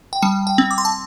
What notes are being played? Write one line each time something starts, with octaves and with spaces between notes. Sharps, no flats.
G5
G3 A5
G5
C4
D6
C6
A5